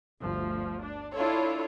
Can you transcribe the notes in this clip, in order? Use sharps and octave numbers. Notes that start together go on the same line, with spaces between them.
G1 D2 F3
D4
D4 E4 F4 A4 C#5